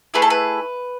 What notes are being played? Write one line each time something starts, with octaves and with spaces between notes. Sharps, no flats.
A3 E4 G#4 B4
A4
B4